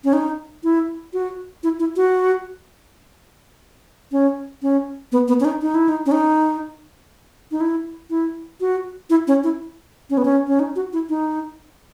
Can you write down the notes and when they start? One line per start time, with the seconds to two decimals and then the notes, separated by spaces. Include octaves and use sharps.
0.04 C#4
0.13 D#4
0.64 E4
1.13 F#4
1.63 E4
1.79 E4
1.96 F#4
4.12 C#4
4.62 C#4
5.12 B3
5.28 B3
5.40 C#4
5.45 D#4
5.62 D#4
5.75 E4
5.89 D#4
6.06 C#4
6.12 D#4
7.51 D#4
7.61 E4
8.10 E4
8.61 F#4
9.10 E4
9.27 C#4
9.43 E4
10.10 C#4
10.18 B3
10.25 C#4
10.47 C#4
10.60 D#4
10.76 F#4
10.93 E4
11.09 D#4